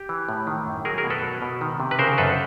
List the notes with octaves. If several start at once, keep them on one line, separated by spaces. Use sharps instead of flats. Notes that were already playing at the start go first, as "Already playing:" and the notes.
Already playing: G4
E3
A2
D#3
F#2
F#3 G#4 A#4
G#4 A#4
B2
A4 B4
F#3
B2
D#3
C3
B4
C#3 A#4 C5
F#2 A4 B4